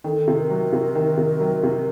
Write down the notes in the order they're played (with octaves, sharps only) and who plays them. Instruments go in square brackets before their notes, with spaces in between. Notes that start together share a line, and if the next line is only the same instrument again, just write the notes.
[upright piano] D#3 [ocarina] A4
[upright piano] C3
[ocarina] A#4
[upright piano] F#3
C3
D#3
C3
F#3
C3